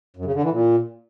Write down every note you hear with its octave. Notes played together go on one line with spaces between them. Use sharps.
F#2
C#3
D3
E3
A#2